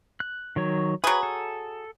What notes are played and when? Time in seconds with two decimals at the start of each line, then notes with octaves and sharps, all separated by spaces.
0.20 F#6
0.56 D#3 F#3 C#5
1.04 F#3 G#4 B4
1.23 A4